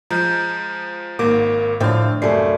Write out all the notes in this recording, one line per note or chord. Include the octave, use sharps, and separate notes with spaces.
F3 G#3 A#5 G6
G#1 G#2 A#3 D6
A2 D3 F3 E5 F5 G5
C2 F#2 A3 D5 C7